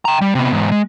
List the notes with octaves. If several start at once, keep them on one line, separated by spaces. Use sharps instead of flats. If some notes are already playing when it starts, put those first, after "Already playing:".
G5 A#5
G3
C3 B3
E2 G#2
G#3